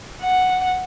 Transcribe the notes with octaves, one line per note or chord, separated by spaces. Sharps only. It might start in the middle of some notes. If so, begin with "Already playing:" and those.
F#5